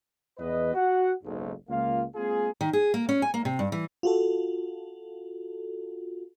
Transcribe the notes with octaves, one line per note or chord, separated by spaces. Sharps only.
E2 B4 D#5
F#4 F#5
F#1 B1 G#2
C#2 A#3 F4 F5
G#3 A#3 C4 F4 G#4
D#3
G#4
A#3
C#4
G#5
A#3
C3
G2
E3
F4 F#4 A4